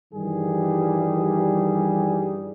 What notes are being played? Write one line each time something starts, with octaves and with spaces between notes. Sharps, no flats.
G2 D#3 E3 G3 G#4